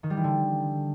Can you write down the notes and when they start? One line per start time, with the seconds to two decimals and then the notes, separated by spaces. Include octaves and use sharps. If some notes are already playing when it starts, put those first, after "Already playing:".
0.03 D#3
0.10 G3
0.17 E3
0.24 D3